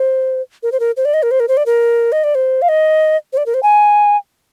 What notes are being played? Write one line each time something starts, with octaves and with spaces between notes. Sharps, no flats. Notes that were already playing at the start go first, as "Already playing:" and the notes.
Already playing: C5
A#4
C5
A#4
C5
D5
D#5
A#4
C5
A#4
C5
D5
A#4
D#5
D5
C5
F5
D#5
C5
D5
A#4
C5
G#5